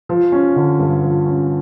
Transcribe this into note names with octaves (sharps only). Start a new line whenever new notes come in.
F3
C#4
D3
G2
F3
C#4